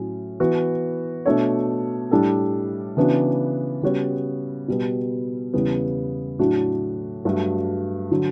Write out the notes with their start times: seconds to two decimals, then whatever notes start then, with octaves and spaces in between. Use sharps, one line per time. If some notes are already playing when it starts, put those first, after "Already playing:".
Already playing: A2 F#3 C#4
0.40 E3 B3 F#4
1.26 B2 A3 D4 A4 C#5
2.11 A2 G3 D4 A4
2.97 C#3 E3 B3 D4 F#4
3.82 C#3 G3 B3 F#4 C#5
4.68 B2 G3 B3
5.53 E2 C#3 G3 B3
6.39 A2 F#3 A3 D4 F#4
7.25 G2 F#3 A3 D4 F#4
8.11 D3 F#3